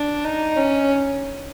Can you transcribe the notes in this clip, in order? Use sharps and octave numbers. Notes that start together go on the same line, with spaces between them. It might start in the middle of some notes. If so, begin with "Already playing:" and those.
Already playing: D4
D#4
C#4